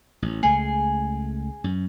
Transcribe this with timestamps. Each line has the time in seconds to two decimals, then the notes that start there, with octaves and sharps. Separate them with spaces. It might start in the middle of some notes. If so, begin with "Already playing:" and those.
0.22 A1
0.43 C#2 A3 G#4
1.64 F#2